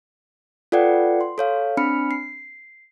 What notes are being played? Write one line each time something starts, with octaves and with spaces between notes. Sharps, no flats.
F4 A4 B4 D5 F#5 G5
C6
A4 C#5 F5
C4 D4 B5 F6 C#7
C7